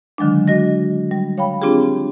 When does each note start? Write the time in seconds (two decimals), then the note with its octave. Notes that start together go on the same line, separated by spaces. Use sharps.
0.18 D3 D#3 F#3 G#3 D4
0.48 F#4 D#5 A#6
1.11 G3
1.38 C#5 F5 G5 B5
1.62 C4 D4 F4 G4 G#4